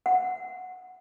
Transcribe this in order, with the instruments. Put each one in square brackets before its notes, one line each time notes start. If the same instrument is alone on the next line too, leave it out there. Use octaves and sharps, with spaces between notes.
[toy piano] F#5